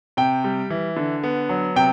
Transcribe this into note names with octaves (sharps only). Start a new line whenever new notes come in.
C3 G5
G3
E3
D3
B3
F#3
C3 G5